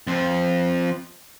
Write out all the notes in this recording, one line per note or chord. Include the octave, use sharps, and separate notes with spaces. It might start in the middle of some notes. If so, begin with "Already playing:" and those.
F2 F3